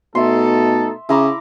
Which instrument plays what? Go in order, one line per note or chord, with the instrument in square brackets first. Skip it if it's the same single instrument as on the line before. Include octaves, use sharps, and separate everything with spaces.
[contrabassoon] B2 [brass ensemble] A3 D#4 A4 [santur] E5 C6
[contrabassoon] C#3 [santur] E4 A#5 D6